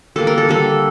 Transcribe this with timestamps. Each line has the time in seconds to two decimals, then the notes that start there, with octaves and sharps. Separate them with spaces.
0.16 D3 G3 A#3 A4
0.27 A#4
0.38 A4
0.49 D3 G3 A#3 A4